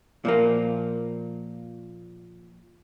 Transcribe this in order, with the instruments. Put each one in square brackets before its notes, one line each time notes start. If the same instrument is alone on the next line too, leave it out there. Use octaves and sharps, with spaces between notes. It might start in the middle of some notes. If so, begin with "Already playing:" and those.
[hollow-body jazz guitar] A#2 F3 A#3